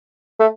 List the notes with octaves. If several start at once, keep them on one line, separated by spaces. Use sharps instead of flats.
A3